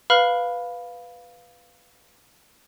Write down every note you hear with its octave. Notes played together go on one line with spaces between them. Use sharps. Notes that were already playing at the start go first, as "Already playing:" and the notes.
B4 F5 B5 F6 F#7